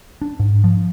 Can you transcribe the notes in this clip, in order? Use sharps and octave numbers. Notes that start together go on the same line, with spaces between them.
D4
G#2
F3